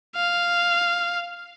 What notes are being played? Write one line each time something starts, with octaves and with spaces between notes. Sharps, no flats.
F5